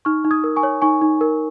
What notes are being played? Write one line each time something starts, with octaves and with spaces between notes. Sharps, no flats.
D#4 C#6 F6
D#4
D#6 G#6
A#4
G#5 C#6
C#5
D#4 G#5 C#6
D#4
A#4